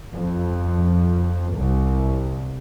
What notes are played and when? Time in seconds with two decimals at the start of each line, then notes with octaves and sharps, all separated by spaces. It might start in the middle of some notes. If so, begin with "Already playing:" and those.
0.15 F2
1.57 C2